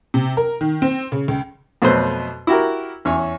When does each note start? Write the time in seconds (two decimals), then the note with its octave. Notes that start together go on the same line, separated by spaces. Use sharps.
0.14 C3
0.37 A#4
0.61 D#3
0.82 C4
1.12 C#3
1.28 C#2
1.82 F2 B2 F#3 A3 B4 C5
2.47 E4 F#4 G4 A#4
3.05 E2 C#4 C#5 E5